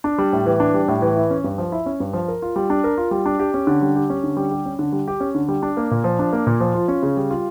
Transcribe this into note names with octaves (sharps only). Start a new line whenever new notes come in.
D4
G3
A2
E3
D4
G3
A2
E3
E4
C#4
G2
F3
E4
C#4
G2
F3
A#4
F4
G3
D4
A#4
F4
G3
D4
G4
C#4
D3
G3
G4
C#4
D3
G3
G4
C#4
D3
G3
G4
C#4
D3
G3
D4
A#3
A#2
F3
D4
A#3
A#2
F3
F4
C#4
C#3
G3
F4